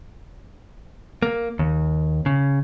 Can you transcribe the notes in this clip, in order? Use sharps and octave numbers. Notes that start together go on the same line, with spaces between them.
A#3
D#2
C#3